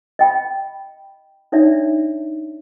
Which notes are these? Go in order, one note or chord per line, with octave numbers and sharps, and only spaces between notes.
D#5 G5 B5
D4 D#4 C#5 D5 E5